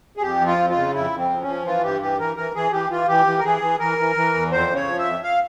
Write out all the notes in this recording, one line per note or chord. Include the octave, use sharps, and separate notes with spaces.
G#4
F2 G4
F3
F4
F2
F4
C#3
F2 E4
F2
C4
F3
C#4
F3
E3 F4
G2 G4
E3 G4
E3 A#4
E3 A#4
E3 G#4
E3 G4
E3 F4
E3 G4
E3
A#4
E3 G#4
E3
E3 A#4
E3
E3
E2
F2 C5
C#3
C#5
F3
E5
F2
F5